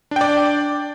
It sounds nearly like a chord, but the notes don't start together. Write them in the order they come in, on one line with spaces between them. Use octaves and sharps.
D4 G5 D5